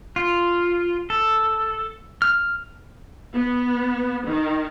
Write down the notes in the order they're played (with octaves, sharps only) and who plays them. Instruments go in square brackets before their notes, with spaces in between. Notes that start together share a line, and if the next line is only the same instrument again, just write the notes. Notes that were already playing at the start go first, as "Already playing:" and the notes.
[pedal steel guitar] F4
A4
F6
[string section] B3
D#3